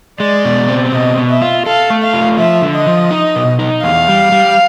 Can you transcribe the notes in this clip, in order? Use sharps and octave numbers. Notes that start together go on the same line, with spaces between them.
G#3 D5
B2
C4
B2 D#5
B2
E5
F4
A4 F5
A3
F5
F4
F3 E5
D3
D#5
F3
D#4
B2
D#4
E2 F5
G3
G3